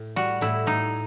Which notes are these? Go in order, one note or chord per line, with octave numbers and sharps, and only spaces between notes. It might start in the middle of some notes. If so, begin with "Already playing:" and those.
Already playing: A2
G3 F#4
A2 E4
A2 D#4